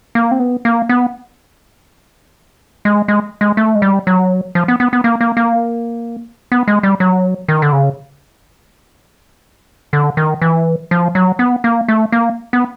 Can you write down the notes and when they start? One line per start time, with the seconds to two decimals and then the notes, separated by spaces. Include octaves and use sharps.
0.15 A#3
0.31 C4
0.40 B3
0.65 A#3
0.89 B3
2.85 G#3
3.08 G#3
3.41 G#3
3.57 A3
3.75 G#3
3.82 G3
4.07 F#3
4.55 F3
4.68 B3
4.80 B3
4.93 B3
5.04 A#3
5.21 A#3
5.37 A#3
6.52 B3
6.68 G#3
6.83 G3
7.00 F#3
7.48 D#3
7.62 D3
7.73 C#3
9.93 D3
10.17 D#3
10.42 E3
10.91 F3
11.15 F#3
11.39 B3
11.64 A#3
11.88 A3
12.12 A#3
12.53 B3